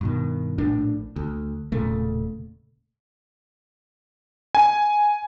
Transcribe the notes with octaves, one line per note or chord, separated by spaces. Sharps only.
G2 B2 D#3
A#1 A2 D4
D2
E1 A#2 C#3 A3
G#5